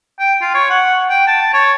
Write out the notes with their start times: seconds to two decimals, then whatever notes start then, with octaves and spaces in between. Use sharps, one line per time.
0.19 G5
0.41 F4
0.54 C#5
0.70 F#5
1.09 G5
1.27 A5
1.54 C#5